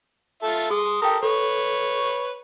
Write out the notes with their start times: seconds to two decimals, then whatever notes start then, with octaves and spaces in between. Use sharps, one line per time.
0.43 F4 A4 E5
0.71 G#4 C6 D#6
1.02 G4 A4 A#4 G5 D#6
1.23 A4 B4 C#5